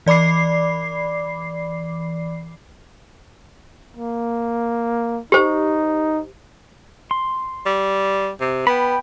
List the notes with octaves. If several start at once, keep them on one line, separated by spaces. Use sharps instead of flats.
E3 D5 B5 D6 C7
A#3
D#4 G4 C5
C6
G3
C3
B3 G5 B5